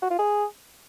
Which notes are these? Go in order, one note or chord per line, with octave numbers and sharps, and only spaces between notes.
F#4
F4
G#4